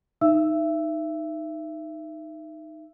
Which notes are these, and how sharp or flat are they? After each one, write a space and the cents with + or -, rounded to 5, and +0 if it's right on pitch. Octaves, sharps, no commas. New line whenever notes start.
D#4 +0 E5 +25 E6 +0